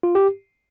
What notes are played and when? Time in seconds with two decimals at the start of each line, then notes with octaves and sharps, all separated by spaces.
0.03 F4
0.15 G4